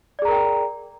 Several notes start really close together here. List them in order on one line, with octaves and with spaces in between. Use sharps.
D5 G#4 A#5 A#4 G5